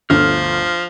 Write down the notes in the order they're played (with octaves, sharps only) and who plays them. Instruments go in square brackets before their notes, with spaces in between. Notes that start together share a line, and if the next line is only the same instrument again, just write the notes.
[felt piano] G1 D2 [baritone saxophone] F3 [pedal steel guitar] F6